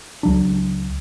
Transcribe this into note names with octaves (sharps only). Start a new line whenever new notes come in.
C#2 F#3 D4